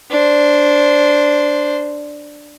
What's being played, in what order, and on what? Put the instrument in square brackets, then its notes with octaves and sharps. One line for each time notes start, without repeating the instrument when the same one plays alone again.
[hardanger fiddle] D4 C5